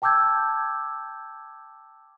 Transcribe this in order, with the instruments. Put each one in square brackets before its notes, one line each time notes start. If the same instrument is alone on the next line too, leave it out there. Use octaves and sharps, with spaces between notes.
[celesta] G5 A5 D6 E6 G6 G#6